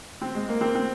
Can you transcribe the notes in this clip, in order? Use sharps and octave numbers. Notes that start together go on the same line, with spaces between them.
C4
G#3
A#3
C4
C4